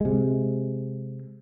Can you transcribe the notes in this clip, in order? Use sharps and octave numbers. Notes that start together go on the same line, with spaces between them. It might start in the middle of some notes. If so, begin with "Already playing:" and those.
C3 G#3